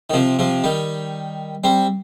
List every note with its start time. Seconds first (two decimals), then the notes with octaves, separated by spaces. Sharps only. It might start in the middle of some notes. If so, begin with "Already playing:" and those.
0.10 D#3
0.13 C3 F3
0.39 C3 F3
0.64 D#3 G3
1.64 G3 C4